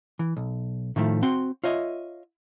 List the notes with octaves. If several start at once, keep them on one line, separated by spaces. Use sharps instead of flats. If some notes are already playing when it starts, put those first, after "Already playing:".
E3
B1
A2 D#3 F3 A3
C4 F#4 C6
F4 C#5 D#5 E5